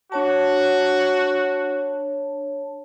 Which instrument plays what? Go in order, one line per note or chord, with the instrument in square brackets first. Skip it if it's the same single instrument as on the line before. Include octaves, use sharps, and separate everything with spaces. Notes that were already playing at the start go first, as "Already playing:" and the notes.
[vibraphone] D4 C#5 A5 [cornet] F#4